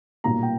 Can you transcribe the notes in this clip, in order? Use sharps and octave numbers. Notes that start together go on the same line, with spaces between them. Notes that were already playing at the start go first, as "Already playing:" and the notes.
B1 A#2 G3 A#3 A#5
G5